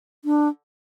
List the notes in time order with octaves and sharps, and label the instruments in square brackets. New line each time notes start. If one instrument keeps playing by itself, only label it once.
[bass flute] D4